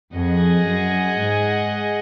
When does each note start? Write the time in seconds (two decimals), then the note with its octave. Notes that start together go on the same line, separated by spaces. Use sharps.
0.14 F2 G#4 D#5 F#5
0.67 F#2
1.20 G#2